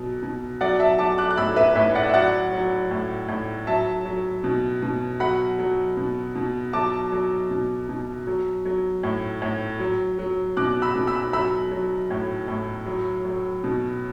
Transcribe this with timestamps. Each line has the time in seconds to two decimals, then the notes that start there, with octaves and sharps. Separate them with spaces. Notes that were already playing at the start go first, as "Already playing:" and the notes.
Already playing: B2 F#3
0.23 B2
0.61 F#3 D5 F#5
0.80 E5 A5
0.99 F#3 A5 D6
1.18 D6 F#6
1.31 F#6
1.37 A2 B5 E6
1.56 B4 E5
1.75 A2 B4 E5
1.95 D5 F#5
2.09 E5
2.14 F#3 D5 F#5
2.53 F#3
2.91 A2
3.28 A2
3.67 F#3 E5 A5
4.05 F#3
4.44 B2
4.83 B2
5.20 F#3 F#5 B5
5.59 F#3
5.97 B2
6.35 B2
6.73 F#3 A5 D6
7.12 F#3
7.50 B2
7.89 B2
8.27 F#3
8.65 F#3
9.03 A2
9.42 A2
9.80 F#3
10.19 F#3
10.57 B2 D6 F#6
10.82 B5 E6
10.95 B2
11.07 B5 E6
11.33 F#3 B5 E6
11.72 F#3
12.10 A2
12.48 A2
12.86 F#3
13.25 F#3
13.64 B2